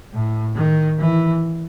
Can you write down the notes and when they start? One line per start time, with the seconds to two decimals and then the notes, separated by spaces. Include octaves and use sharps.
0.13 A2
0.55 D#3
0.99 E3